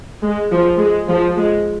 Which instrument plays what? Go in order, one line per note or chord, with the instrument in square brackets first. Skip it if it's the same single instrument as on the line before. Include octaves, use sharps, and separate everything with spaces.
[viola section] G#3
F3
G#3
F3
G#3